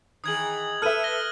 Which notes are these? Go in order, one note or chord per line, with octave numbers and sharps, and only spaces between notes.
D#3 E3 G#4 D#6 G#6 F#7
A4 B4 E5 F6 F#6 D#7
A#6 G7